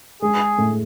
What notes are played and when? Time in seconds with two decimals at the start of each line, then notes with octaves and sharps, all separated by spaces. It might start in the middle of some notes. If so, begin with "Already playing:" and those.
0.22 G#3 G#4
0.58 A2